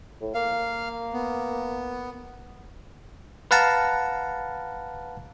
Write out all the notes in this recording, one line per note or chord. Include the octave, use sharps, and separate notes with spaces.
A2
A#3 F5
B3
B4 F5 F#5 A5 A#5